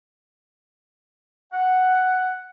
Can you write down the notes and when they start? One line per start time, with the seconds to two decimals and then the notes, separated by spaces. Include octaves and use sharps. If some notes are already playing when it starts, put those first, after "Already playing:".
1.53 F#5